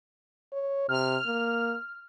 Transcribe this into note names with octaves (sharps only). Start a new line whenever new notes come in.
C#5
C3 F6
A#3